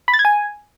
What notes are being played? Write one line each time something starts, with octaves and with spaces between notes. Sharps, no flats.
B5
A6
G#6
G#5